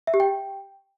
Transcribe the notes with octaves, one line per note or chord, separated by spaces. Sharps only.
E5
G4
G5